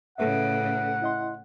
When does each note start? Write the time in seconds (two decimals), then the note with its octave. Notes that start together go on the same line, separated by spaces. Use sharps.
0.18 A2 C#3 A4 B4 E5 F#5
1.02 E4 D#5 C6